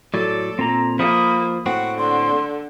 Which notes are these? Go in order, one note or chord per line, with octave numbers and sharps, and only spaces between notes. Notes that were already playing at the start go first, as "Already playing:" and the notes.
A2 F#3 A4 D5
A#2 C4 A#5
F3 A#3 B5 D#6
A2 C4 F#4 F#5
D3 C6